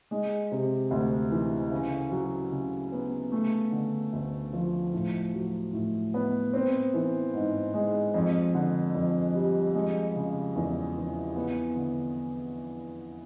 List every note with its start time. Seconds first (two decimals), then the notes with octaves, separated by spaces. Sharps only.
0.11 G#3
0.51 C3
0.91 D2
1.31 E3
1.71 C#3
2.12 F#3
2.52 C#3
2.92 B3
3.32 A3
3.72 D3
4.13 D2
4.53 F3
4.93 A2
5.34 F#3
5.73 A2
6.14 B3
6.53 C4
6.94 E3
7.33 G#2
7.74 G#3
8.14 F2
8.55 D3
8.95 F2
9.34 G3
9.75 G#3
10.15 C#3
10.56 E2
10.96 E3
11.35 B3
11.76 D3